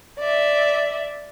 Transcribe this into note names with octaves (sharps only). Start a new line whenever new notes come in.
D5 E5